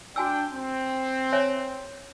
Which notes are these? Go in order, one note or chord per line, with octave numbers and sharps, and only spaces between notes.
D4 F#4 G5 G#5 E6
C4
C#5 E5 G#5